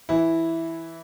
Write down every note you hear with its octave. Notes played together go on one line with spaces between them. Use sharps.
E3 E4